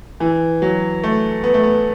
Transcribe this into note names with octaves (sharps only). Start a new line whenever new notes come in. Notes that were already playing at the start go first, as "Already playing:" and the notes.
E3
F#3
A3
B3
A3
B3